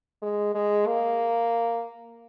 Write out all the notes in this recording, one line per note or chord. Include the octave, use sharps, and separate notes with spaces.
G#3
G#3
A#3